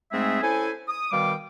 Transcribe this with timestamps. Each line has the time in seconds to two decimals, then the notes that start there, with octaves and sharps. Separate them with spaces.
0.12 G#2 G#3 A3 C4 G#4 E5
0.42 C#4 E4 A4 C5 G#5
0.88 D#6
1.12 B2 D#3 G3 F5 G5 D6